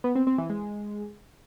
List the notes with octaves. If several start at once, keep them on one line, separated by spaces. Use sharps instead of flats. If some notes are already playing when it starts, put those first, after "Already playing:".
B3
C4
C4
E3
G#3